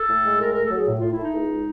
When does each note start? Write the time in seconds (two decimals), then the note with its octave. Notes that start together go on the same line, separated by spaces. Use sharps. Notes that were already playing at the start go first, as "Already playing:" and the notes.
Already playing: A4
0.09 A2
0.25 G#3
0.39 A2 A#4
0.52 A3 A#4
0.63 A4
0.71 F#3 G#4
0.87 A2
0.99 A2 F4
1.11 E4
1.18 A3 D#4
1.34 C#2
1.50 G#3